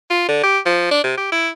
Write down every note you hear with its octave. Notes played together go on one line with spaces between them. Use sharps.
F4
D3
G4
F3
D4
C3
G4
E4